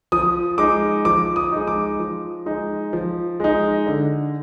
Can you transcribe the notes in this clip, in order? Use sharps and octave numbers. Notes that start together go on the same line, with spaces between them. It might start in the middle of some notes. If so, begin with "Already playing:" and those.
F3 D#6
G#3 D#4 D6
F3 D6
D#6
G#3 D#4
D6
F3
G#3 D#4
F3
G#3 D#4
D3